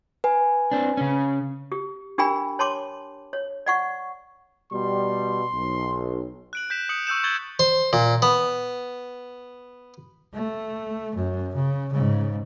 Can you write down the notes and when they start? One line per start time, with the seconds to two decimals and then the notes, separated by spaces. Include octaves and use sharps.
0.24 B4 G#5
0.71 C4 D4
0.97 C#3 C#4
1.72 G4
2.18 D4 G4 A#4 G5 G#5 B5
2.59 C#5 A5 C6 D6
3.33 C#5
3.66 D5 F#5 C#6
4.72 B2 G3 C6
5.54 B1
6.53 F#6 D7 F#7
6.70 G6 B6 E7
6.89 D#6 C#7 F#7
7.07 C#6 E6 G6 E7
7.23 C#6 G#6 A6 F#7 G7
7.59 C5
7.93 A#2
8.22 B3
10.34 A3
11.16 F#2
11.55 C#3
11.93 G#2 C#3